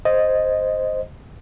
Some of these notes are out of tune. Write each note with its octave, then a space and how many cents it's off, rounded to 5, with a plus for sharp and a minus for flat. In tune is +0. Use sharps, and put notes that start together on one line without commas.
C5 +0 D#5 +0